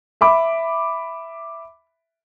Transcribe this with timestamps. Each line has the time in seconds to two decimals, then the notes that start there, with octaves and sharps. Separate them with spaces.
0.21 E5 B5 D6